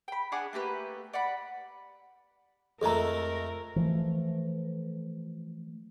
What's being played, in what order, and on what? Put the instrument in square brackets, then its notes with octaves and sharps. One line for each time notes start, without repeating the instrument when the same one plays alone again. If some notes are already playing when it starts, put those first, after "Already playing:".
[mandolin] G5 B5
D4 G#4 F#5 D6
A3 A#3 G4 B4
D5 F#5 B5
[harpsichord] F2 G#3 A3 [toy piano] A4 A#5 [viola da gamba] A#4
[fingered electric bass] E3 F3 A3